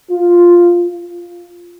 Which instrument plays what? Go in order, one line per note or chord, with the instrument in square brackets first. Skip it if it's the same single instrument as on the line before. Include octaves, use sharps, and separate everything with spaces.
[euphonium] F4